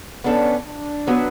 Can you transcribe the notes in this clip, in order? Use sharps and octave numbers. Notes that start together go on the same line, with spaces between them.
B3 C#4 D4 A4
D4
F#3 B3 F#4 B4